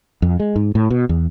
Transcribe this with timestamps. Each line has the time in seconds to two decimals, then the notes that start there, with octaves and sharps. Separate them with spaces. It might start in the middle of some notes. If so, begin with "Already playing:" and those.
0.22 F2
0.40 G#3
0.56 G#2
0.75 A2
0.90 B2
1.09 E2